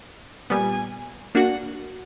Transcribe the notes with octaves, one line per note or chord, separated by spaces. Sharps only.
A#2 G3 B3 G#5
A#3 D4 F#4 F#5